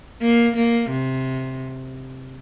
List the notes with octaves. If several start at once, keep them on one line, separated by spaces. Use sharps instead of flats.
A#3
A#3
C3